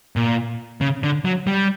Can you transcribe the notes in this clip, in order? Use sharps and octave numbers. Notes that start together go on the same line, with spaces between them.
A#2
C#3
D3
F#3
G3